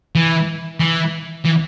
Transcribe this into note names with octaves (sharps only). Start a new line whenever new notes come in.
E3
E3
E3